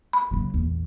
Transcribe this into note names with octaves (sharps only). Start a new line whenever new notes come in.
B5
C#3 F#3
A#1 E2